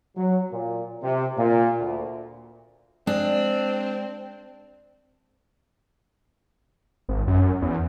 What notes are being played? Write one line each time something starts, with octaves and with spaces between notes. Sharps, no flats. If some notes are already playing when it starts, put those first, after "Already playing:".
F#3
A#2
C3
A#2
D2
G#3 C4 D4
G#1
F#2
E2